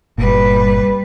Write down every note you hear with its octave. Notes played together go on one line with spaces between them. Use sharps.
G1 A#2 G3 B4